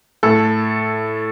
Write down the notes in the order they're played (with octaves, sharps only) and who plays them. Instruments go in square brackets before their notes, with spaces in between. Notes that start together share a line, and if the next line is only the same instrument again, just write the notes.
[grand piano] A2 A4